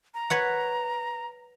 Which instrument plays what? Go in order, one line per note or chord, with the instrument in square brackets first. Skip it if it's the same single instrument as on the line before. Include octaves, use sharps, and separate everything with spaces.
[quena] A#5
[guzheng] B4 C#5 F#5